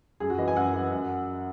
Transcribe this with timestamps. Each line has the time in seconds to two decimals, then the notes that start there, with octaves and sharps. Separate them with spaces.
0.20 F#2 G#4
0.30 F#4
0.38 E3 D#5
0.48 G#5
0.56 F#2 F#5
0.73 E3
0.92 F#2